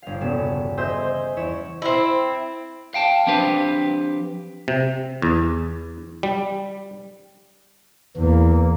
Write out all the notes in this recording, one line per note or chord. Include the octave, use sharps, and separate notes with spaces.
G1 F5
E1 C#3 E3 B3 A4 E7
C5 D#5 E5 G#5 E6 G6
C5
E2 E4 C#5 E7
C4 E4
F5 G5 A5
F3 C4 D4 G4 B4 C5
C3
E2
G3
E2 E3 A#3